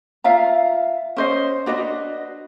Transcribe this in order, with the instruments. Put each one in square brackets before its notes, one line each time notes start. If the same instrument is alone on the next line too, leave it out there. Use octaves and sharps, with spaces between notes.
[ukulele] F4 E5 F5 A#5
C#4 C5 D#5
D4 F#4 B4 D#5